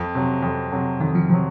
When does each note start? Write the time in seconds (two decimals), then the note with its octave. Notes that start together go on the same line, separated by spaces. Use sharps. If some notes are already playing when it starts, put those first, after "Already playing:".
Already playing: F2
0.15 C3 F#3
0.43 F2
0.72 C3 F#3
1.00 F2 D#3
1.15 F3
1.30 C3 F3 F#3